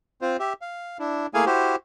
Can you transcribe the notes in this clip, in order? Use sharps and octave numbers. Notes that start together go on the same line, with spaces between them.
C4 F4 C5
G4 E5
F5
D4 E4
A3 A#3 E4 G#4 F5 G#5
E4 F#4 G4 C5